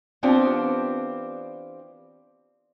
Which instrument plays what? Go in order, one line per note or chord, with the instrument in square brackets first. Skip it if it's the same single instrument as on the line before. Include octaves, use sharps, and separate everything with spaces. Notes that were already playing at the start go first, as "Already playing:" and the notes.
[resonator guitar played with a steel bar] E3 B3 C4 D4 F4 G4